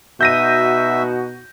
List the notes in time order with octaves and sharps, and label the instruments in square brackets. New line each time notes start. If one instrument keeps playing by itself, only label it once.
[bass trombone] B2 [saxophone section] D#4 F#4 [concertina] E5 [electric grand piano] G6 A#6 D#7